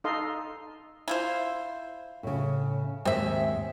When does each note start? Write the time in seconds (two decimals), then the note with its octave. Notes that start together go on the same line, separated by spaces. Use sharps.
0.04 D#4 A4 D#5 F5 C6
1.08 E4 F4 C5
2.23 A2 C#3
3.05 D#2 G#2 G#3 C4 E5